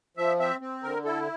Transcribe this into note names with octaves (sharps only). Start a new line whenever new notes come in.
F3 E5
C4 E5
C4
D3 A#4
E4 A4